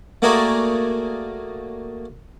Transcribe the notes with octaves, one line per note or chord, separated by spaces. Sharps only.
A3 A#3 F#4 G#4 A#4 D5